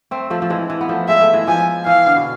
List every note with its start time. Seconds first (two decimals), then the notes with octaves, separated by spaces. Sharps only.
0.11 A3 C4
0.30 F3 A3
0.42 F3
0.50 E3 G#3
0.70 E3
0.81 B3
0.89 F3 A3
1.08 G#3 E5
1.21 A3
1.33 E3 G#3
1.48 F3 G#5
1.86 E3 F5
2.06 D3
2.16 B2